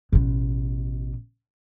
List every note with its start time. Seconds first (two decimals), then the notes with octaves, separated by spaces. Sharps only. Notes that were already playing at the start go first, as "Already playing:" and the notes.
0.12 A1 B2